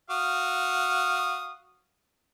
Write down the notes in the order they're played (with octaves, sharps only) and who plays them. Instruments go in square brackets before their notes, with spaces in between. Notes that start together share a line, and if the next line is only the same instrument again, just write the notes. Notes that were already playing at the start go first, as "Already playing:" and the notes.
[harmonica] F#4 F5 D#6